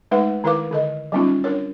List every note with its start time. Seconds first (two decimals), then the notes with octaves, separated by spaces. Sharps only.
0.11 G#3 A3 D#4 B4 F#5
0.44 D#3 E4 A#4 B4 F5 D6
0.71 D3 A4 D#5
1.12 F#3 G3 B3 C#4 D#4 F4
1.44 D4 A#4 C#5